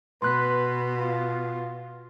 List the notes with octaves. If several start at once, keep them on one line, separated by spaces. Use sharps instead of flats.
B2 B4 C6 F#6 B6
F4